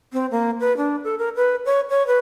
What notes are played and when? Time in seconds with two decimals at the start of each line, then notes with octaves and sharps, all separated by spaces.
0.13 C4
0.31 A#3
0.60 B4
0.77 D4
1.04 A4
1.18 A#4
1.36 B4
1.65 C#5
1.90 C#5
2.07 B4